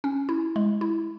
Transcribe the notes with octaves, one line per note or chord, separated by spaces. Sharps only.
C#4
E4
G#3
E4